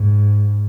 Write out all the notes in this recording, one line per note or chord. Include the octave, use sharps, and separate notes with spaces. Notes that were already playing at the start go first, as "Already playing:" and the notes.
Already playing: G#2